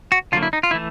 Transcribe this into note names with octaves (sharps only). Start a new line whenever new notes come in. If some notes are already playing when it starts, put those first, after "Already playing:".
F#4
D3 F#3 A#3 F4
E4
D#4
F4
E3 A3 E4